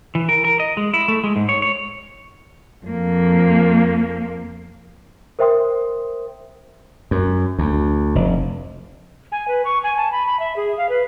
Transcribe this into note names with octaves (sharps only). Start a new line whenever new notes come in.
E3
A#4
A#4
D#5
G#3
E4
A3
G#3
G#2
C#5
C#5
F2 A#3
A#4 C5 E5 G5 C6 D#6
F#2
D2
F1
G#5
B4
C#6
G#5
A5
B5
B5
E5
G#4
F5
B4